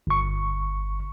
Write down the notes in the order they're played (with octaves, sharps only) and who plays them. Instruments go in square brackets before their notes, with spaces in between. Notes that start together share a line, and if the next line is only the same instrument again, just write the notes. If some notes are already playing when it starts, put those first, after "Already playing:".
[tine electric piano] G1 C#6